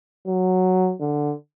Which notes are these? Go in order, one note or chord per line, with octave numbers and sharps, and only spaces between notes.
F#3
D3